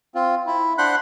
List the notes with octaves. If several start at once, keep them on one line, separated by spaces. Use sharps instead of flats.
C4 F4
E4
D4 C5 F#5 B5 C6 F#6